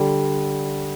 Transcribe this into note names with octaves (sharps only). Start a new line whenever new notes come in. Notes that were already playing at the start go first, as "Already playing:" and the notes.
Already playing: D3 G3